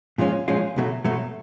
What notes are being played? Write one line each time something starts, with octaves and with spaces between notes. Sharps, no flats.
A#2 F3 G#3 C#4 F4
A#2 F3 G#3 C#4 F4
B1 B2 F#3 A3
B1 B2 F#3 A3